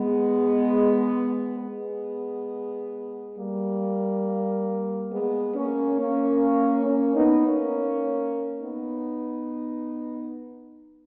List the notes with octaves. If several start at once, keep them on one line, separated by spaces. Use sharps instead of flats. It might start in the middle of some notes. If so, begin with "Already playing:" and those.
Already playing: G#3 B3
G#3 B3
G3 A#3
G#3 B3
A#3 C#4
A#3 C#4
A#3 C#4
B3 D#4
A#3 C#4
B3 D#4